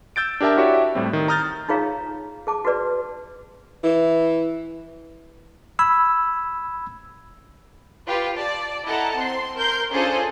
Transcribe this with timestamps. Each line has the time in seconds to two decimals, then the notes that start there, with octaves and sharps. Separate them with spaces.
0.16 E6 G6 A6 D7
0.41 D4 G4 A#4 E5 A5
0.57 E4 F#4 G4 C#5 D5 E5
0.95 A2 G3 C4
1.13 D#3
1.28 A#5 D#6 F6 G6 A6
1.69 D#4 F4 G#4 C#5 F5 A#5
2.47 G#4 A5 D6
2.65 F#4 G#4 B4 D5
3.83 E3
5.79 B5 E6 G#6
8.07 F4 G4 B4
8.37 D5 A5
8.85 E4 A4 D#5 F#5 A5 A#5
9.18 C4 C5 C6
9.57 A#4 C6 G6
9.93 C#4 D4 F4 G#4 A4 C5